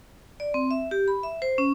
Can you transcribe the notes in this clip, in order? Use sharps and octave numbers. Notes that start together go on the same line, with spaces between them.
D5
C4
E5
G4
B5
E5
C5
C#4